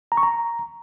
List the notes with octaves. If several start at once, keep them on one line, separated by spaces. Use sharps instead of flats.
A#5
C#6
A#5